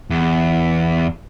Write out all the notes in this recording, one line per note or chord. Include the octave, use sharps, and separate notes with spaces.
E2